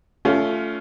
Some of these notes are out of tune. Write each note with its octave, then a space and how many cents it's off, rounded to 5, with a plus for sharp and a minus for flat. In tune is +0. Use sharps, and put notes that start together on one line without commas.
A3 +0 C#4 +25 F4 +0